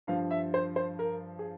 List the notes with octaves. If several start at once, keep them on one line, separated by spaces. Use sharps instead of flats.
G2 F3 F5
E5
C5
C5
A#4
G#4